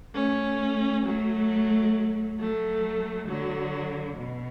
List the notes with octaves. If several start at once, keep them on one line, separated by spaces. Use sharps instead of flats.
A3 C#4
F#3 A3
F#3 A3
D3 F#3
B2